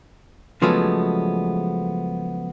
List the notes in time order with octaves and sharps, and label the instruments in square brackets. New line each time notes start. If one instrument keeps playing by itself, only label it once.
[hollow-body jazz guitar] C#3 F3 F#3 G#3 A3 B3